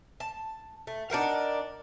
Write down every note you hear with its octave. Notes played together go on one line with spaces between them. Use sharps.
A5
A3
D4 D#4 A#4 F#5